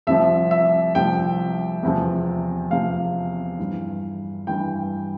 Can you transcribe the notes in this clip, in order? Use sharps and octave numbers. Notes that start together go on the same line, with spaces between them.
C2 C3 F3 E5
E5
C2 C3 F3 G5
E2 C3 F3
E2 C3 F3 F5
G2 E3
G2 E3 G5